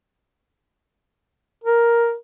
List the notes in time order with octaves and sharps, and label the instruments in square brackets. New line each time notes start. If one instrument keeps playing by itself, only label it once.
[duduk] A#4